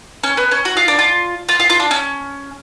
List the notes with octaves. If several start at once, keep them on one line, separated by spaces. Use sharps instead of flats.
C#4
B3
C#4
F#4
F4
D4
F4
F4
F4
F4
D4
C#4